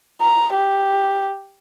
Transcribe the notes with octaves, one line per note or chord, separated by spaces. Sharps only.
A#5
G4